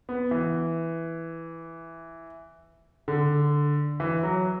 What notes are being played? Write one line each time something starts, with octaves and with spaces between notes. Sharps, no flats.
B3
E3
D3
E3
F#3